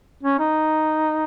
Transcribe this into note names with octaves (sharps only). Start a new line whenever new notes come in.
C#4
D#4